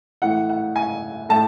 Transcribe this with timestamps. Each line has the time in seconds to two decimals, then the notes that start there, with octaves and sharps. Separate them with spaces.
0.22 A2 E3 F#5
0.49 F#5
0.76 G#5
1.29 A2 A5